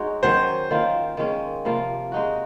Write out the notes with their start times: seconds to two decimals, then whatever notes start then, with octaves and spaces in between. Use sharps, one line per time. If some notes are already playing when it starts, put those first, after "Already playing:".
Already playing: G#3 D#4 F#4 C#5
0.23 D#3 F#3 C#4 C5
0.71 D#3 A#3 F4
1.17 D#3 G#3 C#4
1.65 C3 F3 A#3 F4
2.12 G#3 D#4 F#4